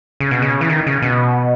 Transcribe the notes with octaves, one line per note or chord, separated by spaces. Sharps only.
C#3
B2
C#3
E3
D#3
C#3
B2